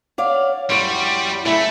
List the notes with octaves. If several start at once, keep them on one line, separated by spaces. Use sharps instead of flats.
C#5 D5 F5 F#5 D6
F#2 G3 E4 F#5 C6 C#6
C#3 A3 E4